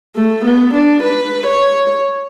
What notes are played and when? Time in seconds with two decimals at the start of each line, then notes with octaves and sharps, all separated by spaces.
0.16 A3
0.45 B3
0.74 D4
1.03 B4
1.47 C#5